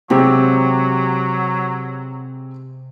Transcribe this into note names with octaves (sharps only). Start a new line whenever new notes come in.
C3 F#3 G#3 C4 G4